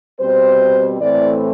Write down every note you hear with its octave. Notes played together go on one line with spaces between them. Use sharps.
B2 G3 C4 C5
A2 E3 A3 C4 D5